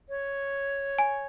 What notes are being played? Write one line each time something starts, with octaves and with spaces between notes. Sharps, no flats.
C#5
G#5